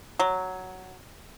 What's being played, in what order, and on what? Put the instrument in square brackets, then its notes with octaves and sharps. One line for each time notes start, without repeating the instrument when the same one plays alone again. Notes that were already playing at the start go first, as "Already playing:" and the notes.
[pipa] F#3